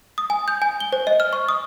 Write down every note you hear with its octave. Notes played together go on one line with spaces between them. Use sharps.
D#6
G#5
G6
G#5
G7
C5
D#5
F6
C#6
D#6